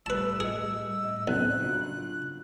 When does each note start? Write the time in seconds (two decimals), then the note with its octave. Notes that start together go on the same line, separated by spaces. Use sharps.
0.06 A2 G3 A3 B4 A5 E6
0.40 G#4 D#5 C#7
1.04 A2 D#5
1.28 B1 C4 C#4 F#6
1.60 C#3 F#3 D4 F4 F#4